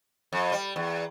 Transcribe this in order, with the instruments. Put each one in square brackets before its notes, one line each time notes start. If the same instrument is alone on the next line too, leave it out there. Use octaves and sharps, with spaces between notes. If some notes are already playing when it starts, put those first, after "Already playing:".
[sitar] F2
G3
E2